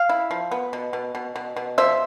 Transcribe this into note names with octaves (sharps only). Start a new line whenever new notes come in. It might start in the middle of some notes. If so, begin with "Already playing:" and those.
Already playing: F5
E4
F3
B3
B2
B2
B2
B2
B2
F3 C5 E5